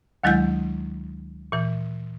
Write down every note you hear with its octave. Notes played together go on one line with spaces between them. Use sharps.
D2 D#3 F#3 G#3 E4 G6
A#2 E3